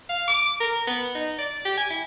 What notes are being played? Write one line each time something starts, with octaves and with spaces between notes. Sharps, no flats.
F5
D6
A#4
B3
D#4
D5
G4
G#5
E4